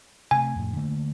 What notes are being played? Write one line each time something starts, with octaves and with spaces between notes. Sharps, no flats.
C3 A3 G#5
F2 A2
D3 A3 A#3